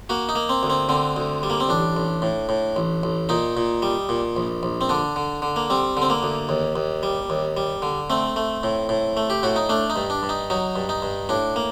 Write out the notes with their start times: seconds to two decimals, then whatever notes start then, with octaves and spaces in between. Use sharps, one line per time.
0.09 A#3 F#4
0.29 D#4
0.35 A#3
0.49 C4
0.63 D2
0.70 C4
0.89 D3 C4
1.17 D2
1.43 G3
1.50 A#3
1.60 C4
1.69 A1 D4
1.96 A1
2.22 A2
2.49 A2
2.76 A1
3.03 A1
3.29 A#2 D#4
3.57 A#2
3.82 G3
4.09 A#2
4.37 A#1
4.63 A#1
4.81 C4
4.89 D3 D4
5.16 D3
5.42 D3
5.56 A#3
5.70 G3 C4
5.97 D3 C4
6.10 A#3
6.23 D2
6.49 D#2
6.76 D#2
7.03 G3
7.30 D#2
7.57 G3
7.82 D3
8.10 A3 C4
8.36 A3
8.63 A2
8.89 A2
9.17 A3
9.30 G4
9.43 A2 F#4
9.56 D#4
9.69 A3 D4
9.90 D#4
9.96 G2
10.10 D4
10.23 G2
10.29 D#4
10.50 F#3 D#4
10.76 G2
10.89 D#4
11.02 G2
11.29 A2 D4
11.56 A#3